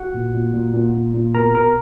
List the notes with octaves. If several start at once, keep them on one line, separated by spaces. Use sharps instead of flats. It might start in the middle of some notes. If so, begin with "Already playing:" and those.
Already playing: F#4 F#5
A#2
A#2
A#2
A#2
A#2
A#2
B2 A#4 A#5
B2 A#4 A#5